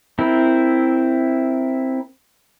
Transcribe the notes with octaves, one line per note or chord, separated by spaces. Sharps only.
C4 E4 A#4